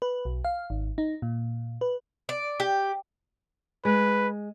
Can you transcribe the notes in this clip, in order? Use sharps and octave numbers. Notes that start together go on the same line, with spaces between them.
B4
B1
F5
G#1
D#4
A#2
B4
D5
G4
G#3 B4